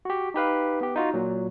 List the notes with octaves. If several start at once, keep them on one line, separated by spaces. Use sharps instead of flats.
F#4 G4
D#4 G4 B4 F5
B3 G4
D#4 F4 F#4
A#2 F#3